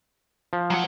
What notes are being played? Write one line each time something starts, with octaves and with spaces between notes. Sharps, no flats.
F3
F#3 F#5